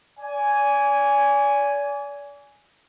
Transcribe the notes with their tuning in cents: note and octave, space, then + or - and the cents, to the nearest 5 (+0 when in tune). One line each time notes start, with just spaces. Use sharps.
D5 -40 G#5 +0